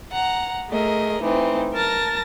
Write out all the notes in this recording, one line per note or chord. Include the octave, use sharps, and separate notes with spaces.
F#5 A#5
A3 G#4 A#4 D#5
E3 A3 C4 D#4
A#4 A5 F6 A6 A#6